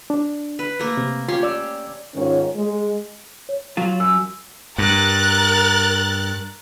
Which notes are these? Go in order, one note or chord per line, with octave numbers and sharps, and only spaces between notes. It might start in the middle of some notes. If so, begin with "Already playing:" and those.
D4
B4
A3 A#3
C3
C#4 F4 G4 C6
D5 E6
G#2 D#3 C#4 F4 C#5
G#3
C#5
F#3 F4
F#2 E6
G2 A#4 F#6 A6